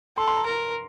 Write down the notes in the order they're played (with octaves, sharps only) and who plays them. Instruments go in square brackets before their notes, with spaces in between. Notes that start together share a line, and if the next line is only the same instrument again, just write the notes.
[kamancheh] A4 [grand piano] C6
[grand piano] C6
A#5
[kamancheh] A#4